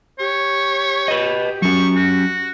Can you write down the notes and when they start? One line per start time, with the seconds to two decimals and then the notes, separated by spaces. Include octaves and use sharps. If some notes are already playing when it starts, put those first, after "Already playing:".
0.19 G4 C#5
1.08 B4 D#5
1.62 F#3 C#4 C#6
1.96 F#4